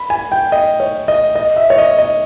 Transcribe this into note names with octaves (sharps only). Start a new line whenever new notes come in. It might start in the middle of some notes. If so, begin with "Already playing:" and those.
Already playing: B5
G#5
G5
D#5
C#5
D#5
D#5
E5
C#5
D#5
D#5